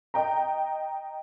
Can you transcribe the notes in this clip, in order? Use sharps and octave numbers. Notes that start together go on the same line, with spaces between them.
D#5 G5 A#5